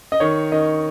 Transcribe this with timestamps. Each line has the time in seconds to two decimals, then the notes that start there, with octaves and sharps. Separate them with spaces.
0.12 D#5
0.20 D#3 C#5
0.52 D#3 D#5